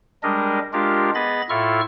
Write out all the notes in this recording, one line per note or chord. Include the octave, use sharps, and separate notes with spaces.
G3 G#3 D4 A#4 D#5
G#3 D4 F4 G4 A#4
B3 G#4 D#5 B5 A6
A2 E4 F4 A4 C#6 F6